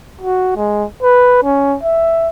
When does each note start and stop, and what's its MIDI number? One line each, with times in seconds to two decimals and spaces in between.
0.21 0.51 66
0.56 0.85 56
1.02 1.40 71
1.43 1.78 61
1.83 2.29 76